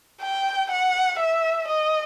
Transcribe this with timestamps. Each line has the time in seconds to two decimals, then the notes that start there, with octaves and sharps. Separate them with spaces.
0.22 G5
0.70 F#5
1.19 E5
1.67 D#5